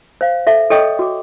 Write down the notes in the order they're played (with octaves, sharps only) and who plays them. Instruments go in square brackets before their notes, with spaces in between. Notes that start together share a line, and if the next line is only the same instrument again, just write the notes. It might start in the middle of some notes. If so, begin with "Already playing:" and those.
[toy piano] C5 F5
A4 E5
A4 C#5 D#5 G5 C#6 D#6
F#4 D6